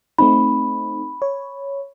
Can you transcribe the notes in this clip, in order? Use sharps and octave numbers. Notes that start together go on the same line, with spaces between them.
A3 C4 D#4 B5
C#5